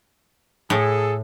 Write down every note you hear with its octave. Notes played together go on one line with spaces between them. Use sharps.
A2 G#4 A4